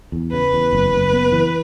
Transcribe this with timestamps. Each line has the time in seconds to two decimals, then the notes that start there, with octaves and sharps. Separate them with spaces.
0.12 E2
0.32 C#3 B4
0.53 E2
0.73 F#1
0.93 F#1
1.13 B3
1.32 E3